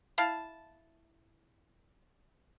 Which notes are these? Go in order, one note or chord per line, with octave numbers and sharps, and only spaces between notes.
E4 F5 A5